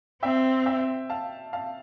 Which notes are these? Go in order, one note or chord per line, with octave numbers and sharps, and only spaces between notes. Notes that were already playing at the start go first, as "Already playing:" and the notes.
C4 E5 G5
E5 G5
F5 A5
F5 A5